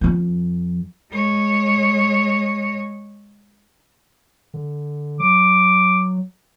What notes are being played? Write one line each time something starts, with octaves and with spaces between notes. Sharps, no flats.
F2 F3
G#3 C#5
D3
F#3 D6